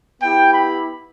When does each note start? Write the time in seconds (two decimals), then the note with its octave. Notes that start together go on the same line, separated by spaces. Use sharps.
0.21 B3 E4 G4 G5
0.54 B5